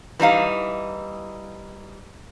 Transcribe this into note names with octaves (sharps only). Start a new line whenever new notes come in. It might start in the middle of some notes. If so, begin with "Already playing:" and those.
E3 G3 D#4 F5